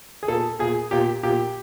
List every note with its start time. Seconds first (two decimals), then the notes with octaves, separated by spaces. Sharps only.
0.23 G#4
0.28 A#2 A4
0.59 A#2 G#4
0.91 A#2 G4
1.23 A#2 G4